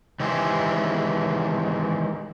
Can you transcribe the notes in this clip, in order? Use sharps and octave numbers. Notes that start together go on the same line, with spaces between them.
D#3 E3 G#3 G4 G#4 C5